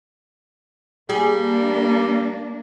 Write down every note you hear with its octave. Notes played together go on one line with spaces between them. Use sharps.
G3 A#3 D4 G#4